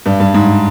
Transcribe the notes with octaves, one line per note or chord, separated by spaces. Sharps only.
G2
G2
G#2